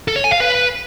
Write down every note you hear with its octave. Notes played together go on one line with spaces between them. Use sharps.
A4
C#5
G#5
F5
B4